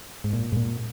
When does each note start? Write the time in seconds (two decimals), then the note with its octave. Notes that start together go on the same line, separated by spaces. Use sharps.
0.24 G#2
0.33 A#2
0.52 G#2
0.57 A#2